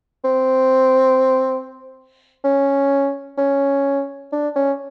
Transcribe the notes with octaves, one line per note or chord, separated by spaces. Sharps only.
C4
C#4
C#4
D4
C#4